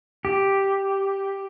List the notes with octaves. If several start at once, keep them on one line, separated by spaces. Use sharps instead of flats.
G4